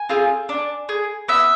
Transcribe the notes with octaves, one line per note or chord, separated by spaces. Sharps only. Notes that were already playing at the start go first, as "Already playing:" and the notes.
Already playing: G#5
C4 F4 G#4
D4
G#4
B3 E5